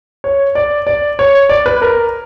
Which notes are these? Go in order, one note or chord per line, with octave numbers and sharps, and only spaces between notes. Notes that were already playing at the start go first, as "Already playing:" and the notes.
C#5
D5
D5
C#5
D5
B4
A#4